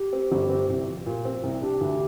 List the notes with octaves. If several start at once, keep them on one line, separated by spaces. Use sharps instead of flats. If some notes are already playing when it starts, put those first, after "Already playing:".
Already playing: G4
C4
G1
C4
C2
F3
A#2
C4
C2
D4 G4
D2